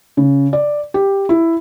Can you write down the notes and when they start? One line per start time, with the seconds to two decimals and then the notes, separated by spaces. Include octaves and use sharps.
0.17 C#3
0.53 D5
0.94 G4
1.29 E4